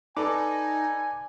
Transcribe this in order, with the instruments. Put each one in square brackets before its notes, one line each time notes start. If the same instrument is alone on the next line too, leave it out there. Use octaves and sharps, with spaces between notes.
[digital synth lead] D#4 [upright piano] A4 B4 [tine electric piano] D5 A5 D6 [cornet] G#5